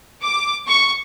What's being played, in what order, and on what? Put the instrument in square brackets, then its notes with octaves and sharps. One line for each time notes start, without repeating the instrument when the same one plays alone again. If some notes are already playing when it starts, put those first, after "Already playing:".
[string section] D6
C#6